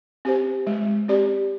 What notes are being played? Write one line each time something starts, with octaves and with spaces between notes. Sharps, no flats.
C4 G4 C5
G#3
C4 G4 D5